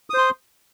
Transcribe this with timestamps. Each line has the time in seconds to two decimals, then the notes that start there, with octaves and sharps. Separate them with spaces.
0.10 D#6
0.14 C5
0.18 C6